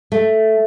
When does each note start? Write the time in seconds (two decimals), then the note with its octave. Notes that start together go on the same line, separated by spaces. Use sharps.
0.12 A3